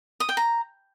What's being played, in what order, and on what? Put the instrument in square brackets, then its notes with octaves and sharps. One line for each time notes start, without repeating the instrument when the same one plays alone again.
[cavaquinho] D#6
G5
A#5